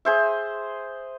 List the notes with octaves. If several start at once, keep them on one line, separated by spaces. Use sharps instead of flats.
G#4 C5 E5